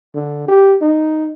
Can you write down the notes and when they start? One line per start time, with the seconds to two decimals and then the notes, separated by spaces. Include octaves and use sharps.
0.15 D3
0.48 G4
0.82 D#4